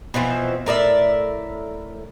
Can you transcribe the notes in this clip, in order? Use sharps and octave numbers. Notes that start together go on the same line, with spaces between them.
B2 E3 F3 C4
A2 A#4 D5 E5